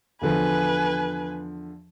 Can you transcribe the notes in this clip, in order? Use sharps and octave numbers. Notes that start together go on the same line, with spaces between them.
E2 D3 F3 B4 G#5